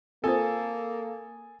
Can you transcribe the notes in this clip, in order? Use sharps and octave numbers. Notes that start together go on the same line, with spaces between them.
A#3 C4 F4 A4 C5 G#5 D#6 A6